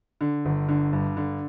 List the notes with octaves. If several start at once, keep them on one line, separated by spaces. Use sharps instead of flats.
D3
G1
D3
G2
D3